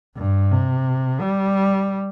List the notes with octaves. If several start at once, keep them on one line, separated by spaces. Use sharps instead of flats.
G2
C3
G3